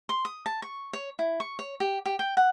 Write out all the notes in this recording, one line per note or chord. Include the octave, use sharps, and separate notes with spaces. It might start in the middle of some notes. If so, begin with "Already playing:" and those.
C6
D#6
A5
C#6
C#5
E4
C#6
C#5
G4
G4
G5
F#5